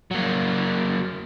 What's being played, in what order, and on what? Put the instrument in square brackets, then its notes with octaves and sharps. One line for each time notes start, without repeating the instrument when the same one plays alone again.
[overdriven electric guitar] F#3 A#3